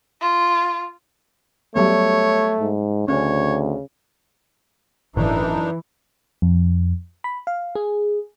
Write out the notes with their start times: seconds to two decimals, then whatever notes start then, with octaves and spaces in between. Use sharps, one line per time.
0.21 F4
1.76 F#3 G3 A3 B3 C#5
2.61 G#2
3.08 D2 C#3 C#4 C#5
5.16 G1 F#2 A2 E3 D4 D#4
6.42 F2
7.24 B5
7.47 F5
7.75 G#4